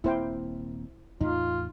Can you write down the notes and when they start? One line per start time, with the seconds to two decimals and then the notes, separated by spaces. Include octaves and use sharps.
0.04 D#1 A#3 C4 E4 C5 G5
1.21 E2 A2 D#4 F4